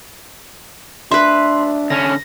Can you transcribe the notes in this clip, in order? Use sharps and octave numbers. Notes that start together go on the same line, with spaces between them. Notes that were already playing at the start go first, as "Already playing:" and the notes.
D4 B4 E5 C6
D3 C#4 A#6